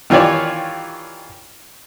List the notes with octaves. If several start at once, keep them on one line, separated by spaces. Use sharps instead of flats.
D#3 E3 F4 G4 C#5 D5